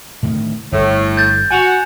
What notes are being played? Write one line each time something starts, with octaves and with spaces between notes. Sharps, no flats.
A2 D3 D#3
G1 A2
G6 A6
F#4 G#5 E7 F7